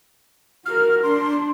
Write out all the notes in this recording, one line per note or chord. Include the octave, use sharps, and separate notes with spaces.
F#4 A#4 F6
D4 C6